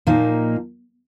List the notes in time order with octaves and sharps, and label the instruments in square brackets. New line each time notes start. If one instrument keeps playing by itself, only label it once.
[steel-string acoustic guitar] A#2 F3 A#3 D#4